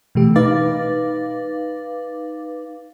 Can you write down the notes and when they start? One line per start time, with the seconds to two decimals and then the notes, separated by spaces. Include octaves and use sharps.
0.15 B2 E3 A3 G4
0.36 D#4 B4 F5 D6 A6